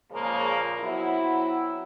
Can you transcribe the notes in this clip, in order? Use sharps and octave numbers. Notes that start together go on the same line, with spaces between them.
A#2 C#3 F3 G#3 A#3 A#4
F#3 B3 C4 E4